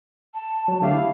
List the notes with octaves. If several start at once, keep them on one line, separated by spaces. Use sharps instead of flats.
A5
F#3
D3 A3 G4 F5
E4